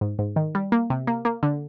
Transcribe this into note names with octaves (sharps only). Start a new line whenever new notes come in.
G#2
G#2
D#3
G3
A#3
C3
A#3
A#3
D3